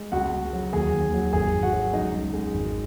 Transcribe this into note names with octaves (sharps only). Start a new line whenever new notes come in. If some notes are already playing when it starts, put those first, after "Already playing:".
Already playing: G#3
C#2 F#4 F#5
C#2
F#3
D#2 G#4 G#5
D#2
F#3
G#1 G#4 G#5
G#1
F#4 F#5
F#3
C#2 D#4 D#5
C#2
G#3
G#1